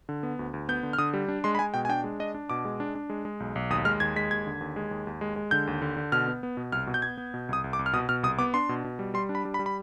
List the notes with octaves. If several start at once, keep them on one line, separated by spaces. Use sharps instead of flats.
D3
B3
D2
D2
B3 G6
D3
F6
D3 D#6
G3
D4
G#3 C6
B5
G#3 G#5
B2 G5
G#5
D4 G5
G#3
D4 D#5
D4
B2 D6
G#3
D4
D4
G#3
G#3
B1
B1
D#2 D#6
G#3 F6
D#2 G#6
G#3 B6
D#2 G#6
D3
D#2
G#3
D#2
D#2
G#3
G#3
D3 G6
D#2
D3
D3
B2 F6
B3
B3
B2
C2 F6
B2
G6
B3 G#6
B3
B2
C2 D#6
C2
D6
C2
F6
B2 D#6
B2 F6
C2 D#6
B3 D6
D4 C6
B2
B2
G3
G3 C6
D4
B5
G3
B5
G3
B5